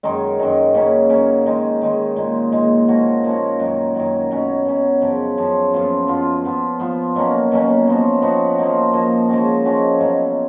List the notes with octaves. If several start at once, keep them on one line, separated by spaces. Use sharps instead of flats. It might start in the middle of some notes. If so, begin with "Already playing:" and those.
F#2 D#3 G#3 D#4
F#2 D#3 G#3 D#4
C#3 F#3 A#3 C#4
C#3 F#3 A#3 C#4
D#3 G#3 D#4
D#3 G#3 D#4
A#2 G#3 D#4
A#2 G#3 D#4
F3 A#3 C#4 F#4
F3 A#3 C#4 F#4
F#2 D#3 F#3
F#2 D#3 F#3
B2 F#3 C#4
B2 F#3 C#4
F#2 C#3 F3
F#2 C#3 F3
F#2 F3 B3 F4
F#2 F3 B3 F4
F3 B3 F4
F3 B3 F4
B2 F#3 A#3 C#4
B2 F#3 A#3 C#4
F3 B3 D#4 F#4
F3 B3 D#4 F#4
F3 A#3 D#4 F#4
F3 A#3 D#4 F#4
F3 G#3 C#4 F#4
F3 G#3 C#4 F#4
B2 F#3 C#4 F4